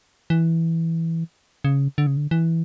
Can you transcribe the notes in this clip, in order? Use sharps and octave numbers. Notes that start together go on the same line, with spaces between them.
E3
C#3
D3
C#3
D3
E3